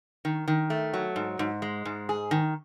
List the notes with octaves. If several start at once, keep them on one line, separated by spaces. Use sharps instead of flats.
D#3
D#3
A3
F#3
G#2
G#2
G#3
G#2
G#4
D#3